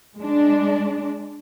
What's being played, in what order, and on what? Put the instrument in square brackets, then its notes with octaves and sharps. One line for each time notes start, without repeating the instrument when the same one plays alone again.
[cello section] G#3 D4